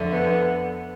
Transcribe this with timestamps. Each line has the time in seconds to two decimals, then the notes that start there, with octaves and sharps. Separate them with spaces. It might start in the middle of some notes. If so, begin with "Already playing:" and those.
Already playing: F2 D3 A3
0.12 B3